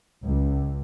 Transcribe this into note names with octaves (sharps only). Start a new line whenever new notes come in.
C#2